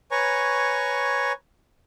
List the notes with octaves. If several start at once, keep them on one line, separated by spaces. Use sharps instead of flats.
B4 C#5 G#5 A#5 C#6